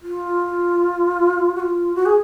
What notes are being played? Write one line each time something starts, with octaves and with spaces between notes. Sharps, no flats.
F4
F#4
F4
F#4
G#4